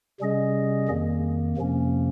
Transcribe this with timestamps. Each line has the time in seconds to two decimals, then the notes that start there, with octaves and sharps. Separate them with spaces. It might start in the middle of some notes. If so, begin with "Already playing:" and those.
0.20 C3 G3 C#4 G#4 D#5
0.89 F2 D#3 A#3
1.57 F2 C3 F3 A#3 C#4